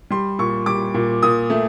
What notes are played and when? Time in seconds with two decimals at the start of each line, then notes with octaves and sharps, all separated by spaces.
0.11 G3 C6
0.39 A#2 C#6
0.66 G3 D6
0.94 A#2
1.23 A#2 D#6
1.50 A3